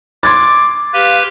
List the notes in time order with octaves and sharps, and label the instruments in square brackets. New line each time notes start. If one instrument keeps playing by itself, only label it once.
[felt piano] C6 G#6 A6 [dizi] D6
[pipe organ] G4 B4 [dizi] F5